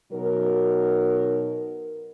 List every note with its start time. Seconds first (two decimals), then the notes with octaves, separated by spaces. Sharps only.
0.12 B2 F#3 D#4 A#4